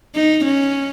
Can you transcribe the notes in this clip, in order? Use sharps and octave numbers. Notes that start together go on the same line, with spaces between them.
D#4
C#4